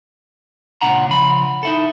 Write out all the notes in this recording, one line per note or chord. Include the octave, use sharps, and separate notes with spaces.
C#2 A#2 C#3 D4 F#5 A#5
C#3 F3 B5
D#4 E4 A4